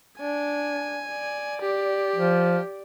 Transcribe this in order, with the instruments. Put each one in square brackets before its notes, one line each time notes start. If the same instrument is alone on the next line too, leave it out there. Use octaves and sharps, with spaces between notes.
[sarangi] D4 [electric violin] G#5
[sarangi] D5
[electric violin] G4
[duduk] F3